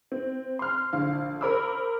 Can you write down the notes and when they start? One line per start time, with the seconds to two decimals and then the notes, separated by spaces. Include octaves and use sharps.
0.12 C4
0.59 C6 F6
0.93 A#1 D3 F5
1.41 A#4 C5 B5 D6 E6